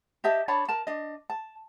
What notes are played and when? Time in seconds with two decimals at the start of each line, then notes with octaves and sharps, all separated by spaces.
0.24 G4 D#5 E5 A5
0.48 D4 C#5 A5 B5
0.69 A#4 A5
0.87 D4 D#5
1.30 A5